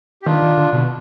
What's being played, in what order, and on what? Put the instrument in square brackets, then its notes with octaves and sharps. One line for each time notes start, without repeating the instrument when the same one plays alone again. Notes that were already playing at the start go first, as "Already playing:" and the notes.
[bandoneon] G4
[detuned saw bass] D#3 [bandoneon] D4 F4
[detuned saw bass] D#3
D3
B2